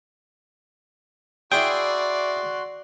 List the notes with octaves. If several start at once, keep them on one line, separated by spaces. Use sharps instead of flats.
E4 F#4 G#4 D5 G5 C6